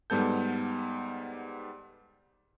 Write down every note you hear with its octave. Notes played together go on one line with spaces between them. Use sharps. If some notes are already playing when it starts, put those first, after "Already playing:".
G#2 G3 B3 A4 G6